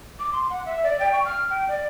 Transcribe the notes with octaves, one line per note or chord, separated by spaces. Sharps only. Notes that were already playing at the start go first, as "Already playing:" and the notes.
D6
C6
F#5
E5
D5
G5
C#6
F6
G5
D5